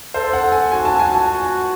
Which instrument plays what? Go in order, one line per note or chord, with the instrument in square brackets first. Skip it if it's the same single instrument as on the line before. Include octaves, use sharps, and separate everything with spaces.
[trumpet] A4 [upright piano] C5
[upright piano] F#5
[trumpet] A4
[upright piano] G#5
[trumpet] F#4 [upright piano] G#5
[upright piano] A5
[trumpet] F#4 [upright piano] G#5
[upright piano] A5